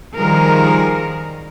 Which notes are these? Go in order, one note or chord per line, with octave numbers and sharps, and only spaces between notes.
D#3 F3 G3 G#4 A#4